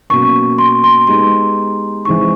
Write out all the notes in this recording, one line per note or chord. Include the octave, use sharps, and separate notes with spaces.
B2 F#3 A#3 C#4 C#6
C6
C6
G#3 B3 D#4 G4 C6
E3 G#3 C4 D#4 C#6